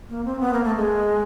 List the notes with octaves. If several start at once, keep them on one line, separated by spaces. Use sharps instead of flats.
A#3
C4
B3
A#3
A3
G#3